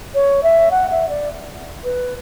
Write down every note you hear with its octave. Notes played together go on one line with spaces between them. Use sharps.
C#5
E5
F#5
E5
D5
B4